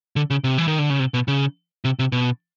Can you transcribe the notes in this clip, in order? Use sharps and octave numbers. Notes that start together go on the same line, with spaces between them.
D3
C#3
C3
E3
D#3
D3
C#3
C3
B2
C#3
C3
C3
B2